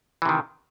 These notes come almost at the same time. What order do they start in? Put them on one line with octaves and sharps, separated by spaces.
E3 C3 D#3